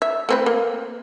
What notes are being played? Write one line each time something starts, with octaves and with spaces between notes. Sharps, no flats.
E5
A3 C4 B4
A#3